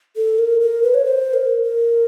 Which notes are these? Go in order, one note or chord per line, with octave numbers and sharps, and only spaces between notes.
A4
A#4
A#4
B4
C#5
C5
A#4
A#4